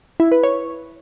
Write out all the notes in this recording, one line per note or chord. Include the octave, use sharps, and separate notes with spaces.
E4
B4
C#5